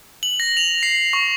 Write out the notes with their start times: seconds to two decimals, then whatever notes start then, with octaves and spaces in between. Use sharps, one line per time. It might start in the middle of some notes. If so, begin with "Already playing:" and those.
0.23 F#7
0.40 A#6
0.57 F7
0.83 C7
1.13 C#6